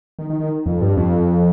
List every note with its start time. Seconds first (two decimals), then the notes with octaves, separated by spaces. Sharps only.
0.19 D#3
0.30 D#3
0.40 D#3
0.66 F2
0.81 G2
0.97 F2